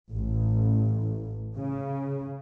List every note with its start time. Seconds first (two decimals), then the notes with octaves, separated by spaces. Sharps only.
0.13 A1
1.56 C#3